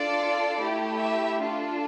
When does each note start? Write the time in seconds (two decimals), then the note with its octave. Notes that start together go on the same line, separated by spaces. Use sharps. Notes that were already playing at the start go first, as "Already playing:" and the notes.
Already playing: D4 F4 A4 D5
0.60 A3 E4 G4
0.99 E5
1.39 D4 F4 A4